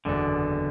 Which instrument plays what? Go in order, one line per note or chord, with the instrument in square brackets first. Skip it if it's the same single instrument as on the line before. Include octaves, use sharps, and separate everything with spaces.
[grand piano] F#1 E2 B2 [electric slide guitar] D3